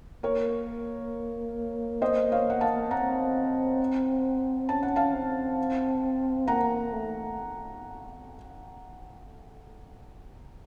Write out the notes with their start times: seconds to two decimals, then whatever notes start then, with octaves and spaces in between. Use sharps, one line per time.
0.23 A#3 A#4 C#5
2.02 C5 D#5
2.32 C#5 F5
2.50 F#5
2.61 F5 A5
2.91 C4 F#5 A#5
4.69 C#4 A5
4.83 F#5
4.96 F5 A5
5.13 C4
6.47 A#3 F#5 A#5
6.92 A3